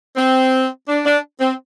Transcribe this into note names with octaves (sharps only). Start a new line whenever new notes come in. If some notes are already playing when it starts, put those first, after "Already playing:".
C4
D4
D4
C4